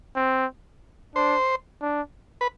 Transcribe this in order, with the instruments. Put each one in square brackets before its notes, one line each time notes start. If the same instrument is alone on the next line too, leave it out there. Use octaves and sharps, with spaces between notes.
[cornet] C4
[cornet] D4 [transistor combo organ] C5
[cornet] D4
[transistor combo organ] B4